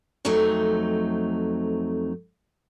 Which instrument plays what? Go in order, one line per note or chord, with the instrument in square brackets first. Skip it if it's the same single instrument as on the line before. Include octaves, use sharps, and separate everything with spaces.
[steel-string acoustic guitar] F2 F#3 A3 C4 D#4